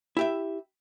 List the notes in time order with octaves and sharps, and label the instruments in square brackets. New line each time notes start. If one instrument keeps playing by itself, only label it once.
[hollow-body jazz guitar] E4 G4 E5